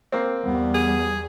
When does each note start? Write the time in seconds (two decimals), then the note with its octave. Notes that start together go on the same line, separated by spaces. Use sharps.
0.12 A#3 C4
0.42 E2 G3 B3
0.74 G#4